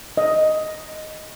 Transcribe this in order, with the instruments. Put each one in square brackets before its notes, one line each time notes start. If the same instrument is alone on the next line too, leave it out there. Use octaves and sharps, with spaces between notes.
[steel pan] D#5